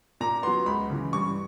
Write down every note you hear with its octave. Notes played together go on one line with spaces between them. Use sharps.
A#2 A#5
F#3 B3 C6
C#2 B5
C#3 E3
G2 C#6